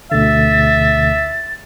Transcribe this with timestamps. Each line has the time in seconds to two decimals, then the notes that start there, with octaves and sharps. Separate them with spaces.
0.12 D2 B2 D3 E5 A6